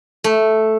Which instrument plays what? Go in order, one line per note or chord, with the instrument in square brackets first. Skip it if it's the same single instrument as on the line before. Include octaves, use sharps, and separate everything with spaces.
[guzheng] A3